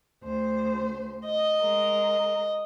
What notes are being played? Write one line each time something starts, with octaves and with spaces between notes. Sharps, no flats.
D2 C5
D#5
G#3 A#4